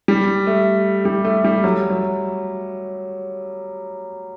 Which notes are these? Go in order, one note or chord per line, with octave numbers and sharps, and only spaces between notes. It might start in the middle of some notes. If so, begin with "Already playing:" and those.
G3
A3
G3
A3
G3
F#3
F#3